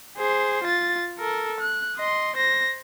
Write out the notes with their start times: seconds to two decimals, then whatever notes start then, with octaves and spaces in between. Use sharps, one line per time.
0.17 G#4 C5
0.64 F4 A6
1.19 A4 A#4
1.60 F#6
1.97 D#5 C6
2.36 C5 A#6